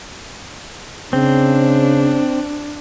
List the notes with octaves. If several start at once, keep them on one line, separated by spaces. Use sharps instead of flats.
C#3 C4 D4